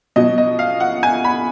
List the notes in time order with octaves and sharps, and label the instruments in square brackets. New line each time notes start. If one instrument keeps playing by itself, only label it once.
[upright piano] B2 F#3 D#5
D#5
F5
F#5
G#5
B5